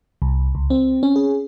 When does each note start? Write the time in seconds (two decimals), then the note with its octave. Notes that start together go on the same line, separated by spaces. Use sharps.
0.22 C2
0.55 C#2
0.70 C4
1.03 C#4
1.16 G#4